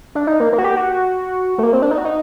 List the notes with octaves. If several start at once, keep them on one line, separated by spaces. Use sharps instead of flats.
D4
D#4
A#3
A#3
F#4
G4
F#4
A3
A#3
C4
D4
D#4
F#4
D#4